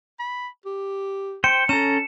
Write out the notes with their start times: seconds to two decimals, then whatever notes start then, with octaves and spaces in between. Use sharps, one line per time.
0.19 B5
0.65 G4
1.44 C5 G5 C#7
1.69 C#4 A4 A#5 E7